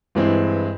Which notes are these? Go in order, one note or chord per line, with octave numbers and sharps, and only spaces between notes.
G2 E3 G#3 C4 E4